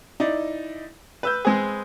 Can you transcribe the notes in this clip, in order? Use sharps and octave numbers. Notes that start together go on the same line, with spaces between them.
D#4 E4 D5
B4 E6 G6
G#3 C4 G#4